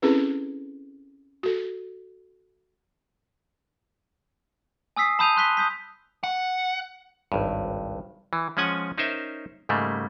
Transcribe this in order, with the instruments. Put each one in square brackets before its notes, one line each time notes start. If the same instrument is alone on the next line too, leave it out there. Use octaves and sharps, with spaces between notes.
[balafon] C4 C#4 E4 G#4 A4 B4
F#4 A4
[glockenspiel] G#5 D#6 E6 B6 C7
A5 B5 D#6 G6 D#7 F7
C6 F#6 B6 G7
D#6 G6 B6
[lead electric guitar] F#5
[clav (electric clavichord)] G#1 C#2 G2
E3
F3 G#3 C#4 F#5 G#5
C#4 D#4 A#4 C5 E5
G#2 C#3 G3 A3 A#3